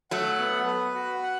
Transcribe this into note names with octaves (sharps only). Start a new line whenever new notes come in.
F#3 A3 F#5
B3
B4
F#4
F#5